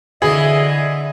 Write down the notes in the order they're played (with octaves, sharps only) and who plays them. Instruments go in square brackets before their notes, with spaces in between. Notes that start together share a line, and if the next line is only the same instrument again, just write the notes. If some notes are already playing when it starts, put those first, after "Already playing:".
[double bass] D3 [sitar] E3 [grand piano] G#4 [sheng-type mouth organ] D#5 E5